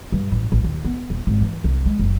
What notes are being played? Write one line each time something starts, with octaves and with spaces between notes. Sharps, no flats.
G2
A1
A1
D#2
B3
D#1
G#1
E3
C2
G#3
F#1